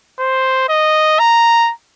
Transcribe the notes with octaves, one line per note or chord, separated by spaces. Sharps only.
C5
D#5
A#5